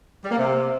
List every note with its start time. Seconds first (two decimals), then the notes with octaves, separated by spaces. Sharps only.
0.24 G3
0.31 A#3
0.38 C3